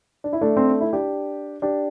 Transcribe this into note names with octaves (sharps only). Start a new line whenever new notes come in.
D4
E4
A3 D4
C4
D4
E4
D4 G4
D4 G4